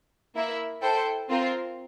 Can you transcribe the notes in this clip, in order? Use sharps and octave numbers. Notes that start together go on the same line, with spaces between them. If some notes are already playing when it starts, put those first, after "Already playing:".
A#3 E4 A#4 E5
E4 A4 C5 G5
C4 F4 A#4